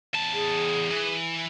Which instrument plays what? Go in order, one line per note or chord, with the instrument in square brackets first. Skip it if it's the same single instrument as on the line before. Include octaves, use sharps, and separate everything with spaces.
[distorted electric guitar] E2 A5
[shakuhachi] G#4
[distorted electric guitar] E3